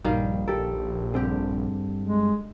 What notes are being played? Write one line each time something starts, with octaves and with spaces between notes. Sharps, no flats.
A#1 G2 D#3 G3 F5
G4 A4 A#4
G2 D3 C4 G4 G#4
G#3